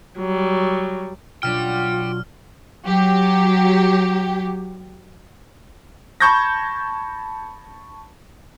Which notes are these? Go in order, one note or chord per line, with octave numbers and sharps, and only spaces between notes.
F#3 G3
B2 F#3 D4 F4 D5 G5 F6
F#3 G4
A5 B5 C#6 G6 G#6 A#6